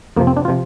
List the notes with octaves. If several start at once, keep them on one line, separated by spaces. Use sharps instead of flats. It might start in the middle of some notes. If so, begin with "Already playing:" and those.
F2 C3 F3 A#3
C4
D4
F4
C3 F3